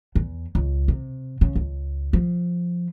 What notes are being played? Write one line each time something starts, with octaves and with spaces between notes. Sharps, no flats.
E2
C#2
C3
C#3
C#2
F3